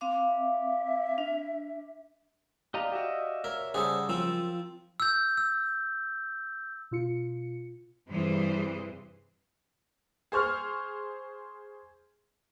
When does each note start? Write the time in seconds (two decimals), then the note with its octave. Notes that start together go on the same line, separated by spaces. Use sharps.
0.01 C4 F5 D6
0.27 E5
1.18 D4
2.74 G4 D5 D#5 F5 A#5
2.92 F#4 G4 D#5 E5
3.44 A#4 C#5 E5 E6
3.74 C#3 G3 G#4 A4 C5 D5 F#5
4.09 F3 F#3 C4 F4 A#4 E6
5.00 E6 G6
5.37 E6
6.91 B2 F4 C#7
8.10 G2 C3 E3 G3 G#4 C5
10.32 G#4 C5 C#6 F6